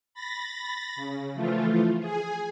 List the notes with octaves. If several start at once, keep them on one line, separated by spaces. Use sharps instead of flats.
B5 A6 A#6
C#3
E3 F3 A3 F4
G#4 G#5